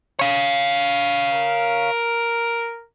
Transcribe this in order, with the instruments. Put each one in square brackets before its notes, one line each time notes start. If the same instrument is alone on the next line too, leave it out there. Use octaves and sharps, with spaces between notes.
[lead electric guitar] C#5 F5
[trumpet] A#4